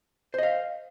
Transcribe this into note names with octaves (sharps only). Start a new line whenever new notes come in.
C5 D#5 F5